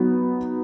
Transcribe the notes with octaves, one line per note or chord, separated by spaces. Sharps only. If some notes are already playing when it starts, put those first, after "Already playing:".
Already playing: F#3 B3 D#4 F#4